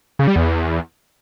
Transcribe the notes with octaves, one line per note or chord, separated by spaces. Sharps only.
C#3
G3
E2